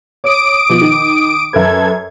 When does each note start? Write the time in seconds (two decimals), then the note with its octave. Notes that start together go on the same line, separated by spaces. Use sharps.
0.24 C#5 D6 D#6 D7
0.70 B2 F3
0.81 D#3
1.53 F#2 A4 B4 G#6